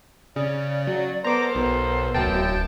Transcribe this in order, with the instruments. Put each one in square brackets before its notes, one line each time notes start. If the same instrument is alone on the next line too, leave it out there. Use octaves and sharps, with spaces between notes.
[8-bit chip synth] C#3 [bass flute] D5
[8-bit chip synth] F#3
[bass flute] B3 [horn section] A4 A#4 C5 [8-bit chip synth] A#5 D6
[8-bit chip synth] B1 [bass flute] B3
[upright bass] D1 [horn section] F#2 [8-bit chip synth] G5 A5